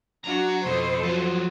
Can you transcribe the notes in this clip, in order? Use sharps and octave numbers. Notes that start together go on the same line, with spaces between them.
F#3 D4 F#4 A#5
F2 B2 A4 C5
F3 F#3